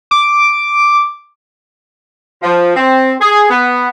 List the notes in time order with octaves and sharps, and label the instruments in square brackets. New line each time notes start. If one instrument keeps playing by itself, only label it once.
[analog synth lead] D6
[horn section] F3
C4
G#4
B3